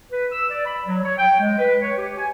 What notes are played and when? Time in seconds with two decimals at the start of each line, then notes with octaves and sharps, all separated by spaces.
0.11 B4
0.32 E6
0.50 D5
0.66 B5
0.85 F#3
1.05 C#5
1.18 G5
1.40 G#3
1.58 B4
1.81 C#5
1.97 G4
2.18 G#5